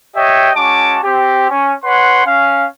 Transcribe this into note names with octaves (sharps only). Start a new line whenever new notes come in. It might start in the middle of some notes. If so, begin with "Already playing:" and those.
G4 C#5 D#5 E5 G5
G#3 C#4 F#4 A5 D6
C4 G4
C#4
B4 C#5 F#5 C6
C#4 F5